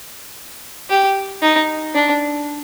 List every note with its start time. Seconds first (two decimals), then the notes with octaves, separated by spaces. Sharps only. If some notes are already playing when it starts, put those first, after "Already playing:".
0.90 G4
1.42 D#4
1.95 D4